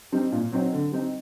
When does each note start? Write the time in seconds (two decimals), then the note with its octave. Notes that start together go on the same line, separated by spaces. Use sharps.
0.12 G3 C4 D#4
0.32 A#2
0.52 F#3 C4 D#4
0.73 D3
0.92 G3 C4 D#4